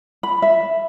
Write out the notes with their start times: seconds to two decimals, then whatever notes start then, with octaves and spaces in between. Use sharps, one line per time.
0.23 B5
0.42 E5